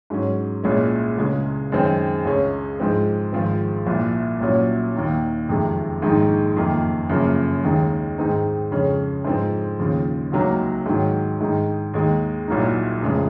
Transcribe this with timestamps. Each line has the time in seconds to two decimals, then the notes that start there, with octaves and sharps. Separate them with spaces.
0.10 G#2 F#3 C#4
0.63 C2 A#2 G#3 C#4
1.18 C#2 C#3 G#3
1.72 F#2 D#3 G#3 C4
2.25 C#2 C#3 G#3 C#4
2.80 G#2 F3 G#3 C4
3.33 G#1 G#2 F3 C4
3.87 C2 A#2 F3
4.41 C2 A#2 F#3 C#4
4.95 D#2 D#3 A#3
5.48 F#1 F2 C3 D#3 G#3
6.02 A#1 G#2 D#3 G#3 D#4
6.56 F#1 F2 D#3 A#3
7.10 F#1 F#2 C#3 F3 A#3
7.64 D#2 D#3 G#3 D#4
8.18 G#2 D#3 G#3 C4 D#4
8.71 F2 C#3 G#3 C#4
9.25 G#2 F3 C4 D#4
9.79 D#2 C#3 F3
10.32 C#2 C3 F#3 A#3 D#4
10.86 G#2 D#3 F#3
11.41 G#2 D#3 G#3 D#4
11.94 D#2 D#3 G#3 D#4
12.48 C2 A#2 F#3 A#3 D#4
13.01 F1 F2 C#3 F3 G#3